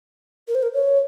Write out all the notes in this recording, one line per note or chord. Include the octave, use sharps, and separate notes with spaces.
A#4
C5
A#4
C#5